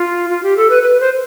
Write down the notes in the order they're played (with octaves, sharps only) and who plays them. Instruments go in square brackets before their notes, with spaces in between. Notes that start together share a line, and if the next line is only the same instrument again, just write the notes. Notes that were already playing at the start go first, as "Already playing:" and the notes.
Already playing: [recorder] F4
F4
G4
A4
B4
B4
C5